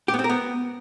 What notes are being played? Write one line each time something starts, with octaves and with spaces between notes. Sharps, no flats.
G4
B3
C4
A#4
B3